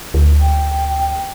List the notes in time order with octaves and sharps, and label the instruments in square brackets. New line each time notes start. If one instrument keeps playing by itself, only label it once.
[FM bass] D2
[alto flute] G5